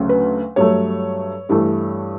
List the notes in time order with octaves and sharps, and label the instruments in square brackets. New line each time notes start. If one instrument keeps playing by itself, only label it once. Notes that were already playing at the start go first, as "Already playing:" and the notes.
Already playing: [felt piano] D2 C#3 F#3 A3
B4
G2 F#3 A3 C#5
G2 E3 A3